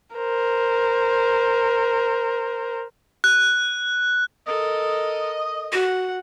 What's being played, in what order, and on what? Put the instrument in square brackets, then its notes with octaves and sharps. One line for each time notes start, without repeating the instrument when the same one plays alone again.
[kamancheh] A#4 C5
[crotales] F#6
[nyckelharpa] A4 A#4 [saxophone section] D#5
[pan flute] F#4 [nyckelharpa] F#5